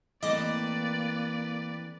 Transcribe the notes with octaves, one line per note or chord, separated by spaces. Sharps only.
E3 A3 A#3 C4 B4 D5 D#5 D6